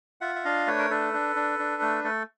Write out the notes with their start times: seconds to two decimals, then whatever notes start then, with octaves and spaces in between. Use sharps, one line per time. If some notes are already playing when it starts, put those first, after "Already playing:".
0.21 F4 E5 F#5
0.35 E5
0.45 D4 D#5 F5
0.67 A3 B4 C#5
0.79 A#4
0.90 D4 A4 B4
1.14 D4
1.36 D4
1.59 D4
1.82 A3
2.04 A3 A4